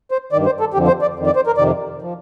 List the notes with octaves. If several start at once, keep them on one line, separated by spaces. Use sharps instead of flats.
C5
G2 D#3 D5
C5
A4
F2 D3 F3 G4
C5
D5
F2 D#3
D5
C5
A#4
F2 C3 D#3 D5
F3